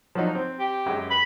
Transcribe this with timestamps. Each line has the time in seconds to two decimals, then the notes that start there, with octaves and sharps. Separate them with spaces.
0.15 F3 F#3 D#4
0.35 C4
0.60 G4
0.86 F#2 G#3
1.10 B5